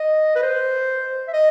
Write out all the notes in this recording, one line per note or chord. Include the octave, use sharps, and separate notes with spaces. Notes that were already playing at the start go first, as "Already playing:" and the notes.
Already playing: D#5
B4
C5
E5
D#5